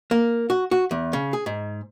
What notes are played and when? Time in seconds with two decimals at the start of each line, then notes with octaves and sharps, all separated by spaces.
0.11 A#3
0.50 F#4
0.71 F#4
0.91 E2
1.13 C#3
1.33 G#4
1.46 G#2